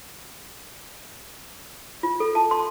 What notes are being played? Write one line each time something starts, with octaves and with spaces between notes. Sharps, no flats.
F4
A4
A5
C6